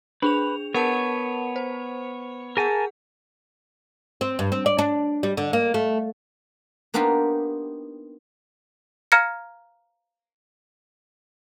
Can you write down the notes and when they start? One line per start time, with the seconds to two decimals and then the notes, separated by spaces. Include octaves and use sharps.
0.22 D4 G#4 B4 F7
0.75 B3 A#4 C#5 F#5 A5
1.56 C5
2.57 G#4 A#4 F#5 G#5 A5
4.21 C4
4.39 G2
4.52 C4
4.66 D5
4.78 D4
5.23 G3
5.37 D3
5.53 A#3
5.74 A3
6.94 A#3 B3 D4 D#4 F4 G4
9.12 F5 A#5 F6 G#6 A#6 C#7